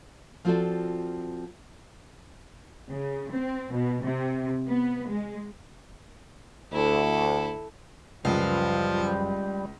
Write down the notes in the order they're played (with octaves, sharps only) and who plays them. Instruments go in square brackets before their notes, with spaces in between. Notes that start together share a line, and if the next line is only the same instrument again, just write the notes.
[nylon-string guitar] F3 C4 F4 F#4 A4 D5
[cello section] C#3
C4
B2
C3
B3
G#3
[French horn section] D2 [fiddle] E4 A4
[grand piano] C#2 [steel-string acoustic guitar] F#2 B4 F5 [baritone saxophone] F3 [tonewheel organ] G3